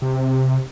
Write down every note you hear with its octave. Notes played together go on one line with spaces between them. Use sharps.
C3